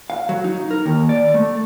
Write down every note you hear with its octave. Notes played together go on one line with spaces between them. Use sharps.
F5
F#3
D#4
A#4
D#2
D5
A3